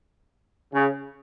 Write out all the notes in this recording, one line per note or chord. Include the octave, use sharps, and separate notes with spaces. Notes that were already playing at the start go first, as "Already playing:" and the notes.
C#3